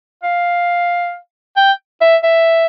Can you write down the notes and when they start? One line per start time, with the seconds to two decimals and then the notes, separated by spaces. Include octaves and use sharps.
0.23 F5
1.56 G5
2.01 E5
2.23 E5